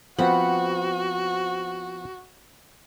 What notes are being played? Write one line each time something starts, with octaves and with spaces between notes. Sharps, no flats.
F3 B3 C4 F#4 F#5 B5